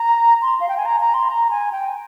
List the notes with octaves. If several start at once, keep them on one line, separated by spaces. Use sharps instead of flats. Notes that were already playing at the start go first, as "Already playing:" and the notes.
Already playing: A#5
C6
F5
G5
G#5
A#5
A#5
C6
A#5
G#5
G5